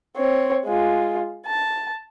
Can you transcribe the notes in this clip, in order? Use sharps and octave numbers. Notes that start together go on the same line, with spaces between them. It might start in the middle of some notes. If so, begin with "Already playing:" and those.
C4 C#5
G#3 F4
A5